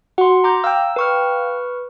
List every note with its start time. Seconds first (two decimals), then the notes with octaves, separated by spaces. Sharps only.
0.18 F#4 F#5 C6
0.44 A#5 D6 G6
0.64 F5 G5 E6
0.96 B4 C#6 F6